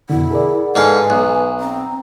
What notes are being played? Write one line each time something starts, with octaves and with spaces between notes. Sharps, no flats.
F2 B2 D3 E4 F#5
G#4 A#4 D5
G#2 D3 B4 F5 G#5
B1 F#6
C4 A#5